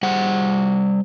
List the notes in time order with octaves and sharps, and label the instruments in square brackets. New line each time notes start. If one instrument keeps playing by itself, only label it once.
[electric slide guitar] G3 C5 F#5